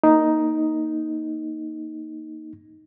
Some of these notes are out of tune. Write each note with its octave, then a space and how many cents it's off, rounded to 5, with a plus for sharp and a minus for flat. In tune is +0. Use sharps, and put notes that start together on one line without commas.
A#3 +0 D#4 +5